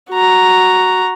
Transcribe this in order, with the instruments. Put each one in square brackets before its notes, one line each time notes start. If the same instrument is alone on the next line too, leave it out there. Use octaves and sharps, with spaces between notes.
[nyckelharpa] F#4 A#5